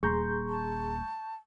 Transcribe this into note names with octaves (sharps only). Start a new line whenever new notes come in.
D#1 G#4 A#5 C6 C#6 G6
A5